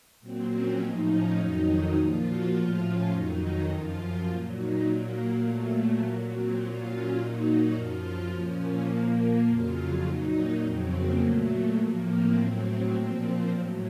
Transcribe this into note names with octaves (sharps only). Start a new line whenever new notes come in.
A#2 F#3 C4
C#4
A2 F3 D#4
C#4
F2 D#3 F#3 D#4
A#2 F3 F4
F#4
A2 F3 F4
C#4
F2 D#3 F#3 D#4
D#4
F#2 F3 F4
A#2 F#3
D#4
A#2 F#3 A#3
A#2 F#3 A3
A3
A#2 F#3
C4
A#2 F#3 F4
C#4
A#2 F#3 D#4
F#4
F#2 F3 F4
A#2 F3 C#4
A#3
A#2 F3
A#3
F2 C#3 F#3 F4
A#2 F#3 D#4
F2 C#3 F#3 C4
A#3
A#2 F#3 A3
A3
A2 F3 A#3
C4
A2 F#3 C4
A#2 F3 C4
A2 F#3